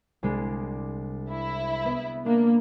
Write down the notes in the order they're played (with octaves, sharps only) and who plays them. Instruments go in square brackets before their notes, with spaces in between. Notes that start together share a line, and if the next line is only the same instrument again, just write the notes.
[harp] C2 G#3 D4
[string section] E4
[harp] B3
[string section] A#3 [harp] D4